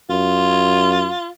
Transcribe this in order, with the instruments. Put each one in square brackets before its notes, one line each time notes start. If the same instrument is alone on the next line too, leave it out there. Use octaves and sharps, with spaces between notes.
[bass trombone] F#2 [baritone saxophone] F4